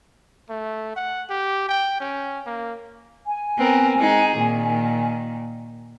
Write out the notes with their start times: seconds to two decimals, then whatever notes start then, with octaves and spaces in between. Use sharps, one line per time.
0.50 A3
0.97 F#5
1.30 G4
1.69 G5
2.01 C#4
2.47 A#3
3.26 G#5
3.58 B3 C4 A#4
3.98 G#3 D#4 G#4
4.37 A#2 D#3